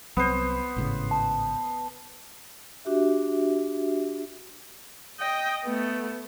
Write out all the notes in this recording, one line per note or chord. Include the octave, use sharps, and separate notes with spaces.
C2 F#3 B3 C4 C5
G#1 A2 C#3
A5
D4 F#4 G4 E5
D#5 G5
A3 B3